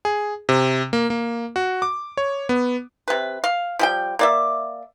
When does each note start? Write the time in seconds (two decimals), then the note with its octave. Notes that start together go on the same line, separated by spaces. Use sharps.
0.05 G#4
0.49 C3
0.93 A#3
1.10 A#3
1.56 F#4
1.82 D6
2.17 C#5
2.49 B3
3.08 C3 B4
3.44 F5
3.79 F3 G3 G5
4.19 A#3 D5 E5